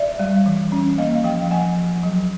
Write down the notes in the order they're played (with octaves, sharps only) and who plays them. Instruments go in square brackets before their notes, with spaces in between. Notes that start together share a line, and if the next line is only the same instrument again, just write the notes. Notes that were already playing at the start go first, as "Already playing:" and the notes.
Already playing: [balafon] D5 E5
G3
E3
C#4
A#3 D#5 F5
F3 F5 G5
F3 F#5 G#5
F3
F#3